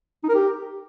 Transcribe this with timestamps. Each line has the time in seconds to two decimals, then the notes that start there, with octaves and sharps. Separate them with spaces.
0.24 D#4
0.29 A#4
0.35 G4